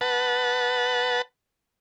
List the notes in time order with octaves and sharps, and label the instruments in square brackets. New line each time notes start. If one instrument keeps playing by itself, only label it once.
[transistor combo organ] B4 F#5 A5